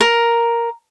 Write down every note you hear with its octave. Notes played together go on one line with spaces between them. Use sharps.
A#4